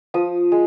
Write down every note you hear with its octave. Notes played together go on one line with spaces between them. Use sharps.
F3 D#6
G#3